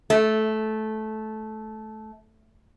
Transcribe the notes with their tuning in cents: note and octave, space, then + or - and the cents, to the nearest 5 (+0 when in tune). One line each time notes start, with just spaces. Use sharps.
A3 -15